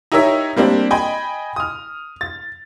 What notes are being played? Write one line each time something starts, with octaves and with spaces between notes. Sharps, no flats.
D#4 E4 G4 A#4 C#5 E5
G3 A#3 C4 D4
D#5 G5 G#5 B5
D#6 F6
A6